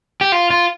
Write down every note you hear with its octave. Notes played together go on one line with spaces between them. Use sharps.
G4
F4
F4